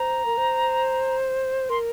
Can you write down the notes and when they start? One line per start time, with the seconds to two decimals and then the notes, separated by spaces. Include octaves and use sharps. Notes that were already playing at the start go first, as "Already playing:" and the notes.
Already playing: C5 A#5
0.26 A#4
0.37 C5
1.70 A#4 C6